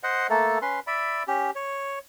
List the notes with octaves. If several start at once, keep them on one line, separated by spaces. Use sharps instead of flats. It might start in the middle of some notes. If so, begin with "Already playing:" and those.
C5 D#5 F#5
A3 A#3 A4
C#4 B4 C6
D5 E5 B5
C#4 G4
C#5